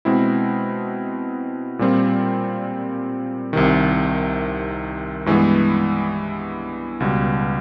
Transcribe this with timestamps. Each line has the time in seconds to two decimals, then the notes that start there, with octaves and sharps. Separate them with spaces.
0.05 B2 G#3 C4 E4
1.79 A#2 G3 C4 F4
3.53 C2 C3 D#3
5.26 G2 E3 G#3 B3
7.00 C#2 B2 G3